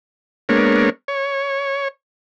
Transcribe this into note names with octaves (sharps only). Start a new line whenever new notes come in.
G#3 A#3 B3 D4 A#4 C#5
C#5